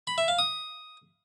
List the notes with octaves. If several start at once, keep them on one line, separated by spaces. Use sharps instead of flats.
B5
E5
F5
D#6